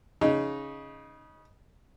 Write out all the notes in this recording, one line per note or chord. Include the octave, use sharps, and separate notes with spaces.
C#3 D#4